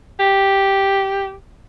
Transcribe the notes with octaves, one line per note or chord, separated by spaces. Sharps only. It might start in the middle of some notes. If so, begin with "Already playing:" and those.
G4